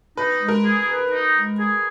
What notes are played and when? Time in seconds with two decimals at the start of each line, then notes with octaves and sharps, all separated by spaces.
0.17 D#4 B4
0.41 G#3
0.48 A#4
0.65 G#4
0.88 B4
1.12 D#4
1.36 G#3
1.59 G#4